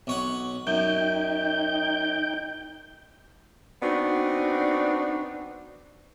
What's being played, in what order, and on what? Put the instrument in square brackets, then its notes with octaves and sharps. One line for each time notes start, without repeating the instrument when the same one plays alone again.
[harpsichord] B1 C#5 F#5
[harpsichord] F#2 [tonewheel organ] D#4 G5 G6
[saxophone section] B3 C4 D4 D#4 F#4